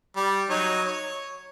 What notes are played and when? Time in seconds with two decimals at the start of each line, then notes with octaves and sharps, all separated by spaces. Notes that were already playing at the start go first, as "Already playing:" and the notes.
0.16 G3
0.50 F#3 D#4 C#5
0.85 C#5